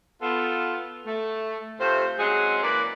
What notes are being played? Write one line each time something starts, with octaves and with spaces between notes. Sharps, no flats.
B3 F4 A4
A3
C3 A3 F4 C5
F#3 G#3 C4 C#4 G#4 F#5
E3 A#3 B4 D5